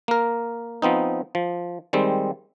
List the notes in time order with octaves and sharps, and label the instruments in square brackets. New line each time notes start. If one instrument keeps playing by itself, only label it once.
[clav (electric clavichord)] A#3 A#4
F3 B3 C4 D#4
F3
D#3 G3 G#3 C4